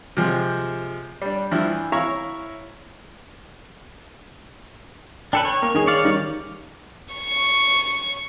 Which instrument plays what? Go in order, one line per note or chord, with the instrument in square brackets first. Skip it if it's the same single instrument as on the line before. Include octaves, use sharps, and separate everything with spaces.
[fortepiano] C3 F3 G#3
G3 D4
G2 F3 E4
E3
E4 C#5 E5 F5 A#5 C#6
[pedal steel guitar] D4 A4 B4 [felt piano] G5
[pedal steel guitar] C#5
[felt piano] A#3
D#3 G#4
[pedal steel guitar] C#5 D5 F5
[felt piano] D#3 G3
[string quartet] C#6